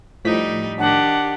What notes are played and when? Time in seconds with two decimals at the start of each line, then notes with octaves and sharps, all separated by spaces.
0.25 A2 F3 G3 D#4 B6
0.79 D#3 D4 G4 F#5